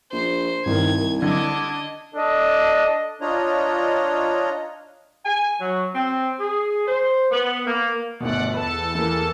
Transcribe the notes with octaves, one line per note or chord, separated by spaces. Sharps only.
A#1 C5
C2 G2 D#3 G#6
D3 D4 D#5 D6 G#6
D4 A4 D#5
D4 F4 C#5 D#5 A#5
G#5
F#3
C4
G#4
C5
B3
A#3
G1 D2 B2 D5 F#5
E2 A4 B4 A5
E3 A3 A#3